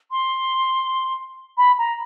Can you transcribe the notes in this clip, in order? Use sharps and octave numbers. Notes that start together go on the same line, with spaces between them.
C6
B5
A#5